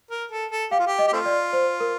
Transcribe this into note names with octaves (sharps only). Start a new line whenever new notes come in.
A#4
A4
A4
G4 F5
F4
G4
D#5
G4
A3 C4 F4
D5
C5
A#4